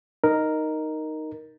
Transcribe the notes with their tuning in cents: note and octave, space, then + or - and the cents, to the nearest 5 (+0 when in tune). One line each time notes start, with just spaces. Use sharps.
D#4 +0 A#4 +0